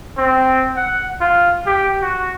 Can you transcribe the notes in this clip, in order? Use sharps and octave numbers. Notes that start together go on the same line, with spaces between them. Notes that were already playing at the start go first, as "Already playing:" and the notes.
C4
F#5
F4
G4
F#4